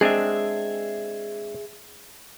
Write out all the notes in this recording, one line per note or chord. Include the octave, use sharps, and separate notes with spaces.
G#3 C4 D4 G#4 E5